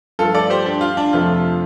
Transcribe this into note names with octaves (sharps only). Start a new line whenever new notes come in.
G2 F3 A3 F4 A4
A4 D5
G4 C5
D4 G4
F4
D4
F2 C3 F3 A3 F4